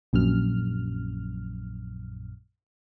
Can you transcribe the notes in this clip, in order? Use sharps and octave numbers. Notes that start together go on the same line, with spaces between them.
A#1 F#2 F6